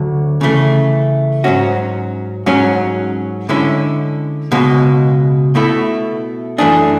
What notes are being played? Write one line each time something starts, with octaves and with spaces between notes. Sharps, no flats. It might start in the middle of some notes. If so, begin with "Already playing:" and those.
Already playing: D2 D3 F#3
C#3 E3 A3
G#2 F#3 C#4 F#4
G#2 F#3 C#4
D3 G#3 C#4 E4
C#2 B2 G#3
B2 A3 E4
F#2 E3 A3 D4 G#4